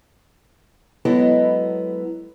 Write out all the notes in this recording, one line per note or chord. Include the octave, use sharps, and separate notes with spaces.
F#3 G#3 B3 E4 A4 D#5